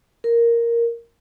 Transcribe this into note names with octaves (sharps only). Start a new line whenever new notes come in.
A#4